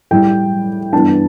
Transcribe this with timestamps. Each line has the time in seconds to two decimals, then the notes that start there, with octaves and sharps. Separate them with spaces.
0.11 A2 G3 E4 G5
0.93 G2 E3 G3 B3 D4 A5